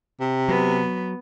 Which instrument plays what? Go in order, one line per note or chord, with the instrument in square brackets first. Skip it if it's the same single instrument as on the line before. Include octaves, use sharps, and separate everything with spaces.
[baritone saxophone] C3
[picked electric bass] F#3 [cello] B3